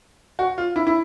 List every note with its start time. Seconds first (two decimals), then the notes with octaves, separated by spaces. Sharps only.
0.39 F#4
0.58 F4
0.76 E4
0.87 E4